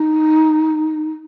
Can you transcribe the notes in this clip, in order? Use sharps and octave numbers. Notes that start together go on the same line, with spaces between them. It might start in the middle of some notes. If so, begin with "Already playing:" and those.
Already playing: D#4